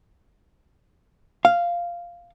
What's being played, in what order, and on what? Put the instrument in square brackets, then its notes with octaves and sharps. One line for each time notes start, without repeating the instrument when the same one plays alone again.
[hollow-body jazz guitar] F5